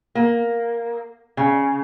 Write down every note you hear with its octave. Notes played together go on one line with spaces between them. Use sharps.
A#3
C#3